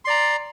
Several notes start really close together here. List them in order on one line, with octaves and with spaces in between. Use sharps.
C6 D5 A#5